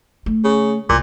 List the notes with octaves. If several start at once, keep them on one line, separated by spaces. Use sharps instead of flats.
A3
C#3
C2 A#2